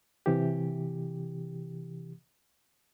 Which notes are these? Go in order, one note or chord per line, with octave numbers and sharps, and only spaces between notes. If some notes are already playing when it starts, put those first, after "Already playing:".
C3 E3 G4